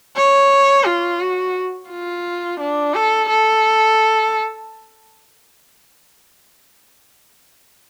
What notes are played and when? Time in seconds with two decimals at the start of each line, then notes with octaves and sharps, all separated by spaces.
0.16 C#5
0.86 F4
1.20 F#4
1.90 F4
2.60 D4
2.94 A4
3.29 A4